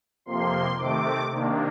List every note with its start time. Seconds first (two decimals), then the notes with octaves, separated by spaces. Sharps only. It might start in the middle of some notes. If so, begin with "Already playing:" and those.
0.26 F2 C3 F3 A#3 C6
0.77 C3 D#3 A3 C4 D6
1.29 C3 D#3 A#3 D4